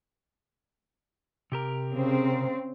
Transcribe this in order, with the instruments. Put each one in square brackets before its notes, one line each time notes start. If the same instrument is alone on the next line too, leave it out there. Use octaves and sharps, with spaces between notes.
[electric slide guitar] C3 G4 A#4
[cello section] C#3 C4